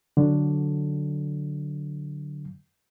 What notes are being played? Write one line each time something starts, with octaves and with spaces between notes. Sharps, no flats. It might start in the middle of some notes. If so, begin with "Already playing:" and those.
D3 F#3